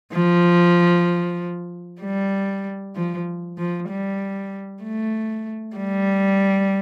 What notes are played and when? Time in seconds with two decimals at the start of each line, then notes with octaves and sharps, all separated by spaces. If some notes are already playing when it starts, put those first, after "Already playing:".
0.13 F3
2.01 G3
2.95 F3
3.58 F3
3.89 G3
4.83 A3
5.77 G3